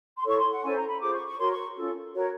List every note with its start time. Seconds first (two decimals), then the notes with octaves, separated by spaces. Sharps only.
0.18 C6
0.25 E4 A4 C#5 C#6
0.38 C6
0.51 F#5
0.63 C#4 E4 A4 C5 G#5
0.76 A#5
0.87 B5
1.00 F4 G#4 C5 D6
1.13 C#6
1.26 C#6
1.38 F#4 A#4 C#5 C6
1.51 C#6
1.76 C#4 F4 A4
2.13 F#4 A#4 C#5